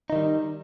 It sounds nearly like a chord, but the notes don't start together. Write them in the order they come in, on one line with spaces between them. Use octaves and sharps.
D#4 D#3 G3